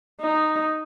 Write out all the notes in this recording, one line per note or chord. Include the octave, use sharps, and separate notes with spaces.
D#4